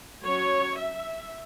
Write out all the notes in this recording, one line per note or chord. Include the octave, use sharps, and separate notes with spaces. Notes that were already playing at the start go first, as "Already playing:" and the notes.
F#3 C#4 C#5
E5